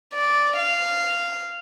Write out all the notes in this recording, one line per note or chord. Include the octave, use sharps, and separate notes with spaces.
D5
F5